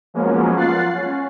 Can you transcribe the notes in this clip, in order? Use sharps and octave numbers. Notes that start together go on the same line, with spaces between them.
F3 F#3 G#3 A#3 B3 C#4
F4 F#5 F#6 A6 C7
C#4